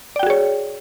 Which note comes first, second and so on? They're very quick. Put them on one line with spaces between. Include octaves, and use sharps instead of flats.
D5 G5 F#4 G#4 C#5